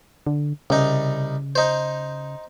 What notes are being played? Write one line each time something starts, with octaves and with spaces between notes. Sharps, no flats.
D3
C2 C#3 D#4
D#4 C5